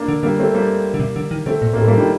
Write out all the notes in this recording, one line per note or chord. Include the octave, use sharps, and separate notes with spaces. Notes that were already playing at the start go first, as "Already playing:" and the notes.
Already playing: A#3 D4
D3
D3 G3 A#3
A3 C4
G3 A#3
D3
C3
D3
D#3
D3 A3 C4
A#2
A#3
A2 A3 C4
G3 A#3
D#3 G3